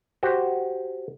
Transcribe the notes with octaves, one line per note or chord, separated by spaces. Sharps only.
F#4 G4 C5